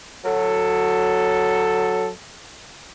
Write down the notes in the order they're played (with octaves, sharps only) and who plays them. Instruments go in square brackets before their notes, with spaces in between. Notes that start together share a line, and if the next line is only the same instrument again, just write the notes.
[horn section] F#3 A4